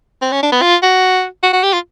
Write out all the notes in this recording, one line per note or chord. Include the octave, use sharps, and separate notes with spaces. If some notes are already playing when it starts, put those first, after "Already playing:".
C4
C#4
D4
B3
F4
F#4
F#4
F#4
G4
F4